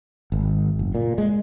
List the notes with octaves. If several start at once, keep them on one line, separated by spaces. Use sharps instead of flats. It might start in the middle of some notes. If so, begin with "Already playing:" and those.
G#1
F#1
A#2
G#3